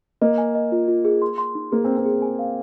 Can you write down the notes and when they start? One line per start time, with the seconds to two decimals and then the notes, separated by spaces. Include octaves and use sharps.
0.21 A#3 D#5
0.38 G#5
0.55 D#5
0.72 F4
0.88 F4
1.05 G#4
1.22 C6
1.38 C6
1.55 D#4
1.72 A#3 G#4
1.85 C4
1.88 G#4
1.97 C4
2.05 G#4
2.22 G#5
2.39 F5